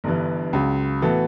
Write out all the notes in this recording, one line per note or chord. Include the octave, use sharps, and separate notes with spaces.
G1 G2 E3
C#2 C#3 F#3
A2 E3 B3 F#4 A4